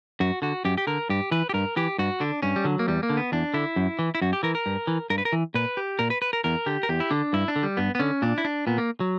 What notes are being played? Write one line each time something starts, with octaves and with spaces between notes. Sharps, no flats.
F#2 F#4
D3 F#4
F#2 G4
G4
D3 A#4
G2 G4
E3 B4
G4
G2 A#4
E3 G4
G2 F#4
D3 D4
G2 C#4
G3
D3 F#3
A#3
E2 G3
A#3
D3
B3
E2 D4
D3 E4
F#2
E3
E4
F#2 F#4
G4
E3 A#4
A#4
G2
E3
G2 A#4
B4
A#4
E3
A#2 B4
G4
A#2 A#4
B4
B4
A#4
E2 A#4
D3 G4
A#4
E2 G4
E4
D3 D4
G2 E4
D4
D3
G3
G2 B3
B3
D3 C#4
A#2 D4
E4
D4
A#2 B3
A#3
F#3